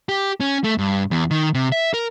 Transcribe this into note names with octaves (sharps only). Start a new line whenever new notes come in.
G4
C#4
A3
G2
E2
D#3
C3
E5
A#4